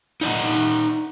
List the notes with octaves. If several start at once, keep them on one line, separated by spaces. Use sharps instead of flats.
D#4 D5 F#5